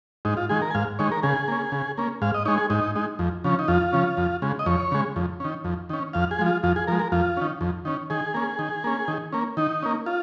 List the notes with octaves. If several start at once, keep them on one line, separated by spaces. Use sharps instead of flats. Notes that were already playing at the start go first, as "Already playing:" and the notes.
G#2 D#4
F4
D#3 G#3 G#4
A#4
G#5
G#2 F5
D#3 G#3 C#5
A#4
C#3 G#4
A#3 C#4
C#3
A#3 C#4
G#2 F5
D#5
G#3 D#4 C#5
G#4
G#2 D#4
G#3 D#4
F2
C#3 F3 C#4
D#4
F2 F4
C#3 F3 C#4
F2
C#3 G#3
D#5
F2 C#5
C#3 G#3
F2
D#3 C#4
F2
D#3 C#4
F2 F5
G#4
F3 G#3
F4
F2 F4
G#4
F3 G#3 A#4
A#4
F2 F4
D#3 C#4
F2
D#3 C#4
D#3 G#4
A#3 C#4
D#3
A#3 C#4
D#3
A#3 C#4
D#3 D#4
A#3 C#4
F4